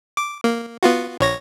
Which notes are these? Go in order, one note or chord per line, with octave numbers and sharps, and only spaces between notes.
D6
A#3
B3 F4 F#4
A#1 C#5 A#6